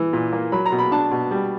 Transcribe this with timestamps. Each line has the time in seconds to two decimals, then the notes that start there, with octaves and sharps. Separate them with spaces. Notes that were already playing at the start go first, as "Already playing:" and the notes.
Already playing: E3
0.13 A#2
0.33 A#3
0.52 F#3 B5
0.66 A#5
0.72 B2
0.78 B5
0.92 D4 A5
1.11 B2
1.31 G3